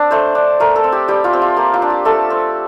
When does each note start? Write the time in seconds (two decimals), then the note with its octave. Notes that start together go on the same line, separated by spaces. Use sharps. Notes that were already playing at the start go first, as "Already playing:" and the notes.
Already playing: C4 D4
0.11 A3 C5
0.35 D4
0.60 A3 A#4
0.76 A4
0.84 C4
0.92 G4
1.08 G3 G4
1.24 F4
1.33 C4
1.41 F4
1.57 A#3 G4
1.74 F4
1.82 D4
1.90 G4
2.05 A3 A4
2.30 C4